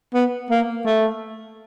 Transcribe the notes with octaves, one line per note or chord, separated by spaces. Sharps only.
B3
A#3
A3